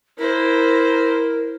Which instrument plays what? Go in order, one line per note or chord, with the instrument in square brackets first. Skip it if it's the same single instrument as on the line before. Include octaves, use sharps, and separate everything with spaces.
[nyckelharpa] E4 C5 [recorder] A#4